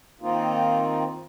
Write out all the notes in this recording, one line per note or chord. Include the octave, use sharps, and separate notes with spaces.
D#3 A#3 C4 D#4 F4